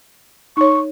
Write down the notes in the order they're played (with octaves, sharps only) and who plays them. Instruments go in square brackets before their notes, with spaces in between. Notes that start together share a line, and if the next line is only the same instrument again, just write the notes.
[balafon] D#4 C#5 [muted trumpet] C#6